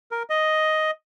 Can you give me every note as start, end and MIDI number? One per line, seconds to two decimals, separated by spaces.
0.11 0.23 70
0.30 0.91 75